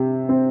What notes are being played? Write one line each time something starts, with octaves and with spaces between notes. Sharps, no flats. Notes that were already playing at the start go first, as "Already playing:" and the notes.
Already playing: C3 G4
C4